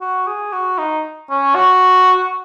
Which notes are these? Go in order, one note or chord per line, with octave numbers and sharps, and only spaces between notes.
F#4
G#4
F#4
D#4
C#4
F#4